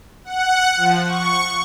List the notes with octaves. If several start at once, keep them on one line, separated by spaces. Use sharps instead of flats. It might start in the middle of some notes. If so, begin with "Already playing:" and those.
F#5
F3
C#6